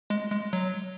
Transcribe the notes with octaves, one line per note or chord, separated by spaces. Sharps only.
G#3
G#3
F#3